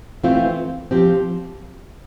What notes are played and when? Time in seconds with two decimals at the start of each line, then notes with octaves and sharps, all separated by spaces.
0.23 E3 A3 C4 F4
0.91 F3 C4 G4